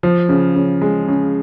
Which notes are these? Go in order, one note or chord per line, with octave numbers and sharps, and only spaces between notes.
F3
C#3
C#3
G#3
C#3